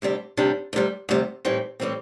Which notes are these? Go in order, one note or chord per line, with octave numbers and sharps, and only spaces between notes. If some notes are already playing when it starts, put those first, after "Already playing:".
D2 C3 G3 D4
D2 C3 G3 D4
D2 C3 G3
D2 C3 G3
A2 E3 G3 C4
A2 E3 G3 C4